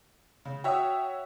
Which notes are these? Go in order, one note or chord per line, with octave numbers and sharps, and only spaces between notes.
C#3
F#4 C#5 E5 G5 D#6